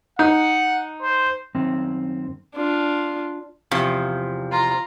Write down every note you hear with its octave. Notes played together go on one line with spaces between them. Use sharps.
D#4 F#5
C5
F#2 D#3 C4
D4 F4
E2 C3 F3
F4 A#5